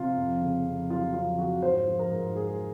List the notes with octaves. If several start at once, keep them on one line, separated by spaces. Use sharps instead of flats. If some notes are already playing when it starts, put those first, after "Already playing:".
Already playing: C3 F4
F2
C#3
F2
F#3 F4
F2 F4
C#3 F#4
G#2 C5
F3
A#4
G#2
G#3 G#4